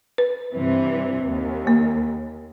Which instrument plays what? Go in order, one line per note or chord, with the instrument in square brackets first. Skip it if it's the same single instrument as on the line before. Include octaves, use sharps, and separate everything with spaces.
[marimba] B4
[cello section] G2 C3 E3
D#2
[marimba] A#3